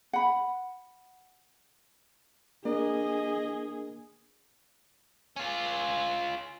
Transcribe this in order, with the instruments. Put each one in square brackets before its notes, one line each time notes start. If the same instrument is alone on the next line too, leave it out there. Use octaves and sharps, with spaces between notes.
[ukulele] F#5 B5
[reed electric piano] A#3 D4 A#4 [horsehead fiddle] G#4 [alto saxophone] D#5
[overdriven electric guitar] C#4 F4